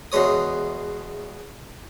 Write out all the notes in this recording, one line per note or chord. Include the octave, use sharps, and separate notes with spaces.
E2 B2 G#3 C#5 D#6